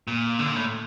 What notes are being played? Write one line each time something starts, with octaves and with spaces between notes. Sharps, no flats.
A#2
D3
A#2
A2